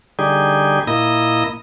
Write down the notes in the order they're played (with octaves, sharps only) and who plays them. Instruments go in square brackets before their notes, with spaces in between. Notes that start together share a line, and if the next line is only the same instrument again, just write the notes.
[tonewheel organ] D3 G3 D#4 G4 G#4
A#2 A#3 E4 D#5 D#6